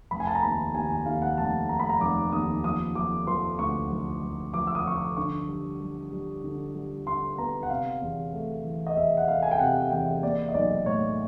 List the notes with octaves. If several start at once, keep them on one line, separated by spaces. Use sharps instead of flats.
F1 B5
G#5
A5
A#5
D#2 B5
D#2 G#5
G#5
D#2 F5
F#5
F1 A5
F1 A#5
B5
A#5
F1 D6
D#2 D#6
F3 D#6
F3 D6
F3 C6
D2 C#6
F3
F3
F3 D6
E6
D#6
F3 C#6
D6
D3 C#6
G3
G3
G3
D3
G3
D3 C6
B3 A#5
F#5
C3 F5
E2
A3
E3
D#5
E2 E5
F#5
E2 F5
G#5
G5
C3 F#5
E2 G5
A#3 D5
D#5
B1 D5
A2 C#5